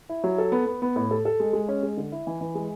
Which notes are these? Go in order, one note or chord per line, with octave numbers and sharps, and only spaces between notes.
E4
F#3
A4
B3
B3
B3
A2
A4
A4
G#3
G#3
C#4
G#3
D3
E4
E3
E3
G#3